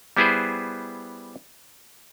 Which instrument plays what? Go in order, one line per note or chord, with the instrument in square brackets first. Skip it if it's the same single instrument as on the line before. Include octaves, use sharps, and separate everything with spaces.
[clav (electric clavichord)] G3 B3 E4 G#4 B4 C5